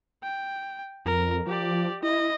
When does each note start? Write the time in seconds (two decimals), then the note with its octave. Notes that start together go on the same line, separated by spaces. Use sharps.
0.23 G5
1.05 F2 A#4
1.47 F3 G4 D5
2.03 E4 D#5